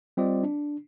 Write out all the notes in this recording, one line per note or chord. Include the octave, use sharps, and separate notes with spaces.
G3 C4 F4 D5 D#5
D4